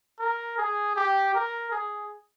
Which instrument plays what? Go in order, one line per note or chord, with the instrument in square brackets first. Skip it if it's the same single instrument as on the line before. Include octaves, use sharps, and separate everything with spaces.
[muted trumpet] A#4
G#4
G4
A#4
G#4